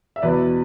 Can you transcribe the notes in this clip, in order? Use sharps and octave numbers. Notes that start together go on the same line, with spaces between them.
E5
E2 B2 B4 D5